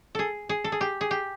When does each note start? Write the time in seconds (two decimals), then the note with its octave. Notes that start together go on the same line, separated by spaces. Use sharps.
0.15 G#4 A4
0.49 G#4
0.64 A4
0.72 G#4
0.81 G4
1.01 G#4
1.11 G4